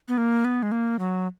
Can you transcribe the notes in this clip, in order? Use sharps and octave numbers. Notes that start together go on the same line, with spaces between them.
B3
A#3
B3
G#3
A#3
F#3